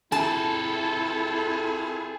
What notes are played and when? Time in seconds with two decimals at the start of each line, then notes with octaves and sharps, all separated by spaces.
0.12 F2 E4 G#4 A4 A5